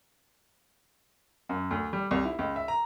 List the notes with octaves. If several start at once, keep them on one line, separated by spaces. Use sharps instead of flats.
F#2
D2
G3
C2
E4
C#2
E5
A#5